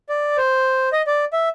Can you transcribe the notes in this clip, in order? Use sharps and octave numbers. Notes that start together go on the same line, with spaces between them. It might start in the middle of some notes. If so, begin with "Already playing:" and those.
D5
C5
D#5
D5
E5